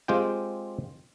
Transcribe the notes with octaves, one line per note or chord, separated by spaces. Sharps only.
G#3 C4 F4 G4 G5